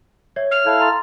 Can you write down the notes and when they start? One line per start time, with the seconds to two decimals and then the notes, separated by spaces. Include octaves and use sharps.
0.36 C#5 E5 G#6
0.51 F6
0.66 E4 A4 F5 A5 F#6 G#6
0.80 A#5 C6 A6